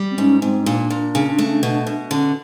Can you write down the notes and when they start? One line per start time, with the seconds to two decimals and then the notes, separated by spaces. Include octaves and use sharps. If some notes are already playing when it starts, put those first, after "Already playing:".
Already playing: G3
0.11 C4
0.18 G#2 C#4
0.42 G#2 C4
0.66 A#2 D4
0.90 A#2
1.15 C#3
1.38 A3
1.63 B2
1.87 B2
2.11 D3 C#4